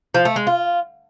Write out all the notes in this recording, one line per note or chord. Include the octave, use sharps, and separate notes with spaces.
F3
A3
G#3
F4